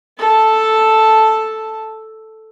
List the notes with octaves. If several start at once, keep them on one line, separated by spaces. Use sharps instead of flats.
A4 A5